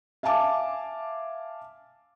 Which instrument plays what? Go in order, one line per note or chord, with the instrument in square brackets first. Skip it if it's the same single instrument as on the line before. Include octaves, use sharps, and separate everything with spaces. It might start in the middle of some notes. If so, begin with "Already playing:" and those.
[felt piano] E5 F5 G#5 A5 D6